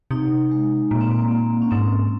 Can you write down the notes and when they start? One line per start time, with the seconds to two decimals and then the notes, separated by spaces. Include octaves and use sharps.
0.11 C3 D#4
0.51 G#3
0.91 A#2 A#3
1.01 C4
1.11 A#3
1.21 A#3
1.31 A#3
1.62 C#4
1.71 G#2 C4